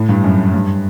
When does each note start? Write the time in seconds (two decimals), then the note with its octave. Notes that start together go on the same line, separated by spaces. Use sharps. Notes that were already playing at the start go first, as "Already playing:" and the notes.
Already playing: A2
0.09 G2
0.24 F#2
0.54 G2